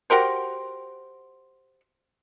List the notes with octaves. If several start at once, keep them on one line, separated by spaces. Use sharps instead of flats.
F#4 G4 A#4 C5